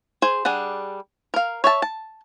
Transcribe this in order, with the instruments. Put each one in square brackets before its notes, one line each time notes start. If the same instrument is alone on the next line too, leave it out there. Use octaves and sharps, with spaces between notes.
[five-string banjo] G#4 C5
G3 D4 G#4 F#5
A#4 F5
C#5 E5 A5
A5